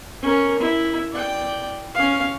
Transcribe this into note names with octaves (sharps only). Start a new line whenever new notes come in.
C#4 A#4
E4
D5 G5
C#4 F5